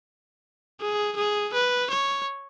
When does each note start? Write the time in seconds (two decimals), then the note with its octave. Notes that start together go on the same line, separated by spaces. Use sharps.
0.81 G#4
1.17 G#4
1.54 B4
1.91 C#5